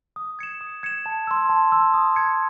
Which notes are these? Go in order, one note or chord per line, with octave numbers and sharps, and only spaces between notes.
D#6
G#6 C#7 E7
D#6
G#6 C#7 E7
A5
C6 E6
A5
C6 E6
D#6
G#6 C#7